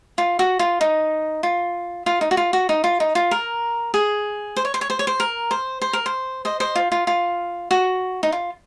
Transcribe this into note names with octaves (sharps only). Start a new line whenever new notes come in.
F4
F#4
F4
D#4
F4
F4
D#4
F#4
F4
F#4
D#4
F4
D#4
F4
A#4
G#4
C5
C#5
C5
C#5
C5
C#5
C5
A#4
C5
C5
A#4
C5
C5 D#5
C5 D#5
F4
F4
F4
F#4
D#4
F4